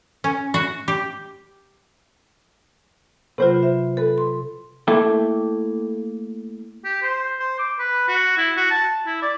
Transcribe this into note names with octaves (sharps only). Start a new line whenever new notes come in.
C#4
F#4
G4
C3 F#3 F4 B4 C5
E5
A4 B4
C6
A3 A#3 E4 A4 E5 G5
G4
C5
C5
D6
B4
F#4
E4
F#4
A5
E4
D5